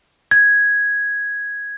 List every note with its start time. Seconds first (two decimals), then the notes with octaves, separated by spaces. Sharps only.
0.31 G#6